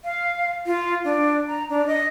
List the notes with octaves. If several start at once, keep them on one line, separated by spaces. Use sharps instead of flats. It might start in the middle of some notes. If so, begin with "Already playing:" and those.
F5
F4
D4
A#5
D4
D#5